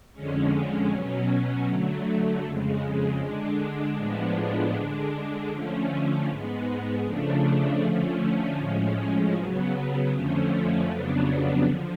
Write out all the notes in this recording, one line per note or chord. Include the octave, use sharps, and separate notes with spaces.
F2 D3 G#3 C#4
B2 F#3 C#4
D3 F#3 A3
F2 C#3 G#3
D3 G#3 D4
A2 F3 G#3 B3 D4
D3 G#3 D4
D3 F3 A3 C#4
G#2 G#3 B3
C#3 F3 A3 D4
D3 F3 A3 C#4
A2 F3 G#3 C#4
C#3 F#3 B3
F2 D3 F3 A3 C#4
F2 C#3 F#3 B3 D4
D3 F3